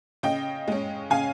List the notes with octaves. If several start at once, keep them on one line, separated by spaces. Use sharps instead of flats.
C#3 D#5 G5
G#3 C#4
C#3 F5 G#5